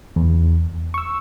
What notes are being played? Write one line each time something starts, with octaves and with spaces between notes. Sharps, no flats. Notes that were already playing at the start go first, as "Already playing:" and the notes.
E2
C#6 E6